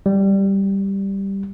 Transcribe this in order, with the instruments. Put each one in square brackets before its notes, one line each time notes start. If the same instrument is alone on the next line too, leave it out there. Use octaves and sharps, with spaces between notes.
[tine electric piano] G3